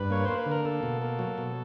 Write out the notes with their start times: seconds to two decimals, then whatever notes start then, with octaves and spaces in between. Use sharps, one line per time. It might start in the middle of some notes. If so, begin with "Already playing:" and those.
Already playing: G2 B4
0.10 A#3 C#5
0.25 A#3 C5
0.38 B4
0.46 D3
0.51 A#4
0.65 A#3 A4
0.83 B2
1.02 A#3
1.19 F#3
1.38 B2